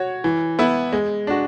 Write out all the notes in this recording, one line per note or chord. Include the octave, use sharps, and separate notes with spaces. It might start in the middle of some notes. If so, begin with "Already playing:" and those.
Already playing: F#4 C#5
E3
B3 E4
G#3
D4 F#4